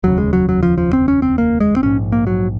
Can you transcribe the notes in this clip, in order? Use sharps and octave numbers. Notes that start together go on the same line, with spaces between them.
F1 D#2 C#3 F#3
G#3
F#3
F#3
F3
F3
C4
C#4
C4
A#3
G#3
C4
A#1 G#2 C#4
A#3
F#3